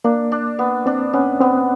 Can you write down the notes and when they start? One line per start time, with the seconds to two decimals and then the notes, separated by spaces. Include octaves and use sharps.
0.04 A#3 D4
0.32 D4
0.59 B3
0.86 C4 D4
1.13 B3 C#4
1.41 B3 C4